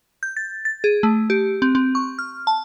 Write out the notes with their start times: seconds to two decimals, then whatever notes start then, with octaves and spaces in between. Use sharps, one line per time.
0.23 G6
0.37 A6
0.65 A6
0.84 G#4
1.03 A3
1.30 G4
1.62 C4
1.75 C4
1.95 C#6
2.19 F6
2.47 A5